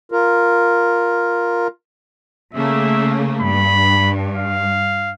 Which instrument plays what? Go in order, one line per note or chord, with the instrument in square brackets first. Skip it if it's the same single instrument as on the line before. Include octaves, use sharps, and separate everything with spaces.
[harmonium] F4 A#4
[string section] C#3 A3 A#3 [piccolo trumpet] E5
[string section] G2 [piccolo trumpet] B5
[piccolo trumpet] F5